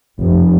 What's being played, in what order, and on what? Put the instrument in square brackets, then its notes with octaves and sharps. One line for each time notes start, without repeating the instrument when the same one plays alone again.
[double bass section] F1